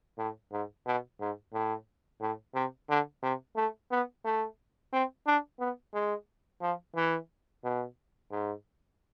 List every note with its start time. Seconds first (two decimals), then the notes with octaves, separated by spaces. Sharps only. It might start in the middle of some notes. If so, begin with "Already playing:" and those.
0.18 A2
0.52 G#2
0.86 B2
1.20 G#2
1.53 A2
2.21 A2
2.55 C3
2.89 D3
3.23 C3
3.56 A3
3.91 B3
4.25 A3
4.93 C4
5.27 D4
5.60 B3
5.94 G#3
6.62 F3
6.96 E3
7.64 B2
8.31 G#2